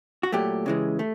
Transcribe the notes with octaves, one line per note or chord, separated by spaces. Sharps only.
F#4
A#2 F#3 A3 G4
C#3 E3 G#3
A3